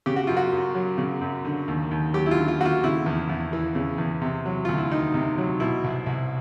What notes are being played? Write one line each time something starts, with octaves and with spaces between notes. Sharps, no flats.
C#3 G4
F#4
F#2 F4
F#4
F#2
F#3
C#3
F#2
D3
D#2
D#2
F#3 G4
E4
F4
D3
F4
D#2 F4 F#4
C#3 E4
E2
E2
E3
C#3
E2
C3
F#3
D2 F4
E4
D#3 D#4
C3
F#3
B2 E4
C2
C2